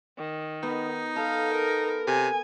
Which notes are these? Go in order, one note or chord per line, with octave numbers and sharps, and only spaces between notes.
D#3
B3 D#4
A4 F5
A#4
C3 G#5